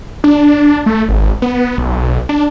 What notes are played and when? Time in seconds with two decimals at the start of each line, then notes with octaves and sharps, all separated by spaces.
0.24 D4
0.86 A3
1.08 G#1
1.42 B3
1.78 B1
2.29 D4